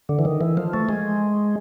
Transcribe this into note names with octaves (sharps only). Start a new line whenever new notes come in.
D3
E3
D#3
E3
F3
A3
G#3